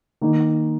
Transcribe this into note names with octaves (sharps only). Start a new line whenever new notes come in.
D#3 A#3 D#4